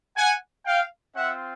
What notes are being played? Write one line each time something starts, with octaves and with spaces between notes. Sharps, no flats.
F#5 G#5
F5 G5
C4 F4 E5 F#5